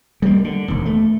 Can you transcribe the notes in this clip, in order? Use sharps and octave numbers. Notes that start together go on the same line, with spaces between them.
G3 A#3
D3
E1 D#2
A3